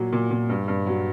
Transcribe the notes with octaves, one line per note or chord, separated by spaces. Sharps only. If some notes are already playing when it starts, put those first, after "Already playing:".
Already playing: A#2 F#3
A#2
A#2
G2
G2
F#3